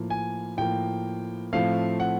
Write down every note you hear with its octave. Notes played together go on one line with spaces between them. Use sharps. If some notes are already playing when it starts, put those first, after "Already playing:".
Already playing: A2 F3 A#3
G#5
A2 F3 A#3 G5
A2 F3 A3 C4 F5
F#5